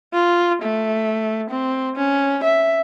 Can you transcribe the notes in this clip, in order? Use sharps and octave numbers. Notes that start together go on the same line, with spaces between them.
F4
A3
C4
C#4
E5